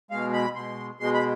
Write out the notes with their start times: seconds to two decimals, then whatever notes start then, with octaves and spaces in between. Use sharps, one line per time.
0.11 B2 G#3 F5
0.33 B5
0.55 B2 G#3 C6
1.00 B2 G#3 C6
1.14 B5